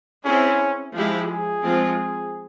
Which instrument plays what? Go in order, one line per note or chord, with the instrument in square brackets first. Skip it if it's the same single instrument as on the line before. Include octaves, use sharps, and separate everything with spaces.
[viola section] C4 E4 G#4 [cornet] C#4
[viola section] F3 G#3 E4 G4
[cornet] G#4
[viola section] F3 G#3 C4 F4